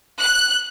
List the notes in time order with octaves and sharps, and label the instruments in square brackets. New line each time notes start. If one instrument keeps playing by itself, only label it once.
[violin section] F#6